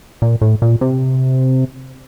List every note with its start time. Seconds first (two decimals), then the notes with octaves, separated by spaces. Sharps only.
0.22 A#2
0.41 A2
0.62 A#2
0.81 C3